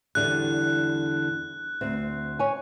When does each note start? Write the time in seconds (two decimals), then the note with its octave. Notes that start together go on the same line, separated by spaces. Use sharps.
0.15 E2 D3 G3 F#6
1.81 D2 C4
2.39 C#5 G#5